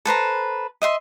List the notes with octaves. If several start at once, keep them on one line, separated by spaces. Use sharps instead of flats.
A4 B4 C5 A#5
D#5 E5 C6